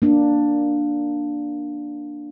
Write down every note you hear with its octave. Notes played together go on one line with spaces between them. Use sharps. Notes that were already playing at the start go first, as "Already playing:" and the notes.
A#3 D4